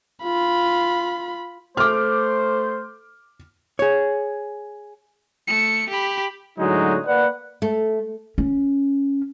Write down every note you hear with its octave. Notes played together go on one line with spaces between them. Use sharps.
F4 B5
A3 C5 D6 F6
G#4 C#5
A3 C#7
G4 B5
A2 D3 F#3 G#3 D#4 F#4
A#3 B4 D5 F#5
A3
C#4